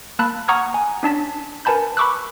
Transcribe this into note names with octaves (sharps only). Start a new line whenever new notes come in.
A#3 A5 B5 F#6
F#5 A#5 C#6 D#6 F6 G#6
G#5
C#4 D4 A5 B6
A#4 B4 G#5 A5 B5 G6
B5 C#6 D6 E6 F#6